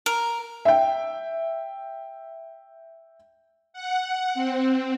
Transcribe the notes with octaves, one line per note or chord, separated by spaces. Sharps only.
A#4
E5 G5
F#5
C4